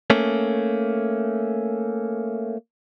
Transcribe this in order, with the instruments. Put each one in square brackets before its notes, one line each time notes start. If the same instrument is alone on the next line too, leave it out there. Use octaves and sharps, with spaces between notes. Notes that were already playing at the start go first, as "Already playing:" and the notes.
[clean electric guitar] A3 A#3 C#4